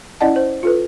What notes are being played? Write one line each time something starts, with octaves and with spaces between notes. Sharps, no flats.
C#4 E4 D5 D#5 F#5 A5
C5
F4 A4 B4